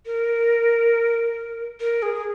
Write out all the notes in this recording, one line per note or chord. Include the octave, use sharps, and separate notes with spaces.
A#4
A#4
G#4